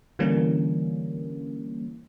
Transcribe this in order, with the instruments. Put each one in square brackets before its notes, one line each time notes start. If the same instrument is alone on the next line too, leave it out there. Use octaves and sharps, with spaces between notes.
[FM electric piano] D3 E3 G3 A#3 C#4